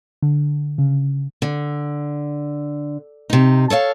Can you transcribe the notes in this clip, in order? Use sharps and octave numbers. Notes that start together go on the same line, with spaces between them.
D3
C#3
D3
C3 D#4
A4 C#5 E5 F5